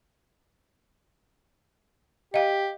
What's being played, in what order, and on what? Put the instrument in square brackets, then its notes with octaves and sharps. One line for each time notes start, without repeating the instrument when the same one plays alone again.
[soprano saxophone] G4 [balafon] D#5 F5